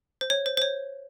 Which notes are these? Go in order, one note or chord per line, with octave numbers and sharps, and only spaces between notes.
C5
C#5
C5
C5
C#5